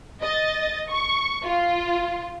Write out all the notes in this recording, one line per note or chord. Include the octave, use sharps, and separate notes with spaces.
D#5 A6
C#6
F4